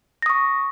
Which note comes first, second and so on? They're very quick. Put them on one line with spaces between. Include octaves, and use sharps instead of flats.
A#6 D#6 C#6